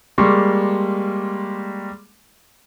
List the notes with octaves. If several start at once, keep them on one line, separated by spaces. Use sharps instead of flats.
G3 G#3 A#3 C6 C#6